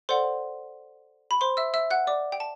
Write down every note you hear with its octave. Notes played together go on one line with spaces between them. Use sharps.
A4 C5 D5 F#5 C6
B5
C5 C6
E5 E6
E5 E6
F#5 F#6
D5 D6
G5
A5